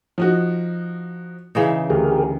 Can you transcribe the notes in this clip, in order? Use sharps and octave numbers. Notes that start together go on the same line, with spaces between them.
F3 D#4 F#4
C#3 E3 D#4
D2 G4 G#4 A#4